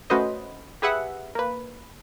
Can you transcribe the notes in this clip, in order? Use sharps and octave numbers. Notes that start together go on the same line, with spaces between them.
A3 C#4 F#4 B4 C5 D#5
G4 G#4 B4 E5 F#5
A#3 B4